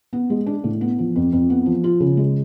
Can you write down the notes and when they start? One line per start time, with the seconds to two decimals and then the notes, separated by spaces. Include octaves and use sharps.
0.13 B3
0.30 G#3
0.46 D4
0.64 A2
0.81 B3
0.99 F3
1.16 F2
1.33 F2
1.50 B3
1.66 F3
1.84 F4
2.00 C#3
2.17 G#3